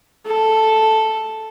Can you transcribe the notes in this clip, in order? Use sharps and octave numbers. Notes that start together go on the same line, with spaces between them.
A4